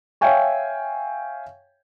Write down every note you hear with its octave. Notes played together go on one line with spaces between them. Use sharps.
C#5 E5 F5 G5 G#5 C#6